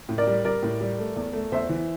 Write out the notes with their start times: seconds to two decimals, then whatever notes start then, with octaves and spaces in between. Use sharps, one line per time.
0.09 A2
0.18 A#4 D5
0.27 G3
0.44 G3 A#4 D5
0.63 A2
0.80 G3
0.98 A3
1.16 E2
1.33 A3
1.52 E2 C5 E5
1.69 E3